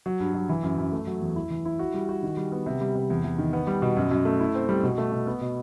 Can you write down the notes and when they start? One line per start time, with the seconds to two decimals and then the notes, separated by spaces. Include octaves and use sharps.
0.06 F#3
0.20 G2
0.34 F#3
0.49 E3
0.63 F#2
0.78 F#2
0.92 A3
1.07 F#3
1.21 E2
1.36 E4
1.50 E3
1.65 E4
1.79 F#4
1.94 G3
2.09 F#4
2.23 D#3
2.37 G3
2.52 B3
2.66 C3
2.81 G3
2.95 C3
3.10 E2
3.24 E2
3.38 D#3
3.53 B3
3.67 G3
3.82 B2
3.97 F#2
4.11 F#2
4.25 A3
4.40 E4
4.55 C4
4.69 G3
4.84 B2
4.98 A3
5.12 B2
5.27 B3
5.41 B2